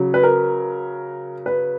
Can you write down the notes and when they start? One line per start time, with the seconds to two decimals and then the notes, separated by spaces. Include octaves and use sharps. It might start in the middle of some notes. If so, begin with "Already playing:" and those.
Already playing: C#3 F#3
0.14 B4
0.23 A#4
1.46 B4